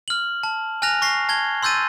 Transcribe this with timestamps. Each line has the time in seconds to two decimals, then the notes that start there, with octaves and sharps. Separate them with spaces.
0.08 F6 F#7
0.43 A5
0.82 G#5 F6 F#6 A#6 F7
1.02 C#6 A#6 C7
1.29 A5 G#6 G7
1.63 C6 E6 G6 A6 D#7